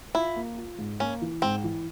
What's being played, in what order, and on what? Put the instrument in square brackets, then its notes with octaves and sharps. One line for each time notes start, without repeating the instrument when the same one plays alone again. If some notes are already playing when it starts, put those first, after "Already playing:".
[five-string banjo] E4 [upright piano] F4
[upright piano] A#3
F4
G#2
[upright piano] A#3 [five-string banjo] C#4
[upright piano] E3
[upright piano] G#2 [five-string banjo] C4
[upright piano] E3